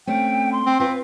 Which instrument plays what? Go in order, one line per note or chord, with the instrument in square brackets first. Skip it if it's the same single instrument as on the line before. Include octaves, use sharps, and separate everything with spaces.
[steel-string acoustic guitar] A3 C4 C#4 [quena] G5
[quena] C6
[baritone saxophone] C4
[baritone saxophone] C4 [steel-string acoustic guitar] F4 B4